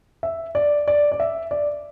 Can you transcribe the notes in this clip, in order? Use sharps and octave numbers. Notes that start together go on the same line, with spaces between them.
E5
D5
D5
D5
E5
D5